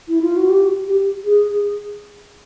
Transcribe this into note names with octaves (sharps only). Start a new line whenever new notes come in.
E4
F4
F#4
G4
G4
G#4